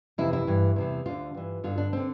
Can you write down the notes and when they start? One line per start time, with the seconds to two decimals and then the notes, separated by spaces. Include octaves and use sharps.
0.18 F2 C3 E3 E4
0.33 E4
0.47 G2 E3
0.76 E2 C3 E3
1.06 D2 D3 F4
1.34 G2 E3
1.64 G2 D3 F4
1.78 D4
1.93 D3 C4